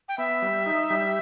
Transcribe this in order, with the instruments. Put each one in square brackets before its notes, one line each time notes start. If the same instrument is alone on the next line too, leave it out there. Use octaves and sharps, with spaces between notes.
[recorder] G5
[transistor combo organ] B3 [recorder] E5
[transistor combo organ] G3
D#4
G3